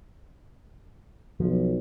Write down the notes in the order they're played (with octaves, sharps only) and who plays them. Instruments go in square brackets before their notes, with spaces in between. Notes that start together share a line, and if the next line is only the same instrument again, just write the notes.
[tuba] B1 [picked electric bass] F3